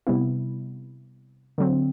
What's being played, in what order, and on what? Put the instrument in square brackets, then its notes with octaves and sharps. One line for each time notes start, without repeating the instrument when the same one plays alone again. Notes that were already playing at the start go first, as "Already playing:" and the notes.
[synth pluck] C3 G3 B3 E4
D3 F#3 C4